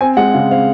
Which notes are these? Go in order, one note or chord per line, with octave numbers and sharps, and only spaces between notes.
C4 G#5
G#3 F#5
C#3 F5
C4 F5